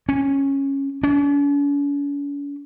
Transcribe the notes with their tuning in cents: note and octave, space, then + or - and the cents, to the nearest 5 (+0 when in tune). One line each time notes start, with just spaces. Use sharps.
C#4 -10
C#4 +45